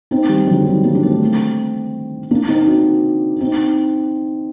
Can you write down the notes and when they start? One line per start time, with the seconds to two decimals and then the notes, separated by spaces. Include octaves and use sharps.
0.11 C4 D#4
0.29 D#3 G3
0.47 D3 F#3
0.66 D#3 G3
0.84 G3 A#3
0.95 D4
1.03 A3 C4
2.31 A#3 D4
2.48 C4 D#4
2.67 D4 F#4
3.41 C4 D#4